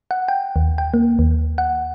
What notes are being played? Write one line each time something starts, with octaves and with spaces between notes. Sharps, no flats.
F#5
G5
D#2
G5
A#3
D#2
F#5